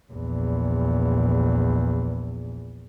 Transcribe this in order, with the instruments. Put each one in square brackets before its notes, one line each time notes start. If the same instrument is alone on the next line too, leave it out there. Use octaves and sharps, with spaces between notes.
[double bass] A#1 E2